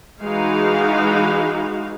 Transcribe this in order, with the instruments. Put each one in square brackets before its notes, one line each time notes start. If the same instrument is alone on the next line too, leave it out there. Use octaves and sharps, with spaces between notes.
[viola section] E3 G#3 D#4 F#4 G#4 F5